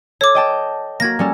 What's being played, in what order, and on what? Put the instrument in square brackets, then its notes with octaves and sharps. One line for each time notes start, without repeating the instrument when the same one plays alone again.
[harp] A4 [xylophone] C#5 D6
[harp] D#5 G5 A5
[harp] A#3 F#4 [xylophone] G#6 A#6
[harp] G3 C#4 A4